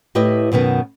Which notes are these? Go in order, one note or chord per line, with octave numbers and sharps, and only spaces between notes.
A2 E4 G4 B4 D#5
F#2 B2 D#3 B3